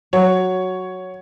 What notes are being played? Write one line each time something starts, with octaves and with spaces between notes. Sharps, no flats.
F#3 C#5